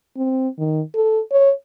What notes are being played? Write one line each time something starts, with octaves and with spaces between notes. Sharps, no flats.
C4
D#3
A4
C#5